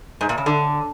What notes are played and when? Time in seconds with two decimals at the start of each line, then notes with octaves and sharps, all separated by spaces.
0.21 G#2
0.29 A#2
0.38 C#3
0.46 D3